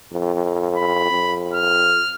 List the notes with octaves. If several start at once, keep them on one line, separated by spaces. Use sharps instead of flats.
F2
B5
F2
F6